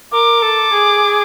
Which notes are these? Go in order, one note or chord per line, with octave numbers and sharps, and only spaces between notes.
A#4 D6
A4
G#4